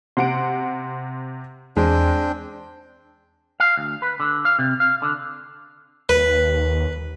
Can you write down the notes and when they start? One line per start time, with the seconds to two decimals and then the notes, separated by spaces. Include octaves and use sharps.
0.17 C3 F#5 C6 D7
1.77 E2 G#3 C4 D4 G5
3.60 F5
3.77 D2
4.02 B4
4.20 D3
4.45 F5
4.59 C3
4.80 F5
5.02 D3
6.09 D#2 B4